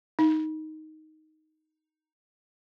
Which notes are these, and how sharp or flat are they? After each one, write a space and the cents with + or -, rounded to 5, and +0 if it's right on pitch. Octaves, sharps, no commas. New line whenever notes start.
D#4 +5